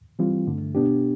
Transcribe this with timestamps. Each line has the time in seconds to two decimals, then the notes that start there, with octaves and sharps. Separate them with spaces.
0.19 E3 G3 C4 F4
0.47 G2 D3 A3
0.75 B2 B3 D4 G4